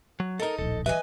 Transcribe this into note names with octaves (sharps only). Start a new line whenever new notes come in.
F#3
D#4 A4 A#4 D#5
D1 A#1 A4
E3 B4 D#5 E5 G#5